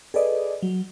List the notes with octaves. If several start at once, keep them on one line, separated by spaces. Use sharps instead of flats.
G#4 A4 B4 D5 D#5
F#3